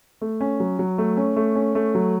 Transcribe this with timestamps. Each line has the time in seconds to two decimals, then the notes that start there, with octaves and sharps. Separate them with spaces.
0.21 A3
0.41 C#4
0.60 F#3
0.79 F#3
0.98 A3
1.17 C#4
1.36 A3
1.55 C#4
1.75 A3
1.95 F#3